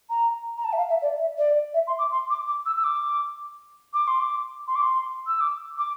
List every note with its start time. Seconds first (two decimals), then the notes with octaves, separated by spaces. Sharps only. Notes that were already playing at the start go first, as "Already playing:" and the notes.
0.10 A#5
0.58 A#5
0.64 A5
0.73 E5
0.77 F5
0.90 E5
1.02 D5
1.20 E5
1.38 D5
1.74 E5
1.87 C6
1.99 D6
2.12 C6
2.30 D6
2.48 D6
2.66 E6
2.77 E6
2.84 D6
3.94 D6
4.08 C6
4.20 D6
4.68 C6
4.76 D6
4.82 C6
5.27 E6
5.41 D6
5.78 D6